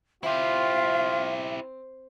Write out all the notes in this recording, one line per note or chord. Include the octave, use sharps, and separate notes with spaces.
C4 E4 F4 G4 E5